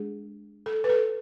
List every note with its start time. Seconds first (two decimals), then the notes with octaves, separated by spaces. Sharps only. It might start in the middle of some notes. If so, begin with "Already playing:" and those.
Already playing: G#3 D4 G#4
0.66 A4
0.84 B4
0.89 A4